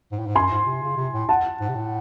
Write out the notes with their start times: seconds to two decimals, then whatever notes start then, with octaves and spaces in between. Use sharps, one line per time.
0.12 G#2
0.19 A2
0.26 G#2
0.35 F#2 G#5 C6
0.51 G#2
0.67 C3
0.82 C#3
0.97 C3
1.13 A2
1.29 F#5 A5
1.61 G#2
1.69 C3
1.75 A2